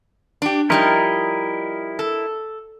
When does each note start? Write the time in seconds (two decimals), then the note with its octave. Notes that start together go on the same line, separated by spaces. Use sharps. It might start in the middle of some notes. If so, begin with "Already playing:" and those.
0.42 D4 G4
0.70 F3 G3 D#4 E4 A#4 D#5
1.99 A4